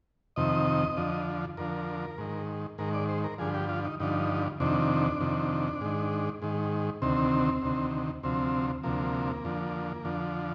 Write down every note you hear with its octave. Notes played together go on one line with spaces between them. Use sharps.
F2 C3 D#3 D#5
F2 D3 F3
F2 D3 F3 A#4
G#2 D#3
G#2 D#3 A#4
D5
C5
A#4
G2 D3 F3 G#4
G4
F4
D#4
G2 D3 F3 D#4
F2 C3 D#3 D4
F2 C3 D#3
G#2 D#3
G#2 D#3
D2 C3 D#3 C4
D2 C3 D#3
D2 C3 F3 C4
D2 C3 F3 A#3
F2 D3 F3
F2 D3 F3